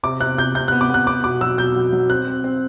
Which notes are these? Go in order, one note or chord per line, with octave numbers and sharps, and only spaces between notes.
C3 D6
C3 F#6
C3 G6
C3 G6
B3 F#6
D6
B3 F#6
B3 D6
B2 D6
F#3 E6
B2 G6
F#3
F#3
C4 F#6
C4
C4